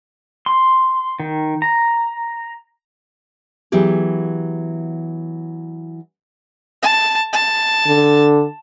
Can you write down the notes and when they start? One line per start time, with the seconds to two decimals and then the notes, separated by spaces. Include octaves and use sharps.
0.46 C6
1.20 D#3
1.62 A#5
3.72 E3 F#3 B3 G4 G#4
6.82 A5
7.33 A5
7.87 D3